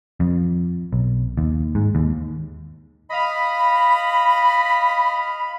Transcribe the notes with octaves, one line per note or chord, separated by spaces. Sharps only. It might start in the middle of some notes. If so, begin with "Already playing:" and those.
F2
B1
D#2
G#2
D#2
D#5 F5 B5